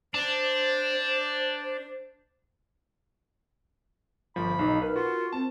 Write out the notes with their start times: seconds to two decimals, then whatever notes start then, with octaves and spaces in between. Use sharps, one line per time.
0.14 D4 C5
4.36 G1 F3 B5
4.59 B1 D#4
4.82 A#4 B4
4.96 F4 F#4
5.33 C4 A5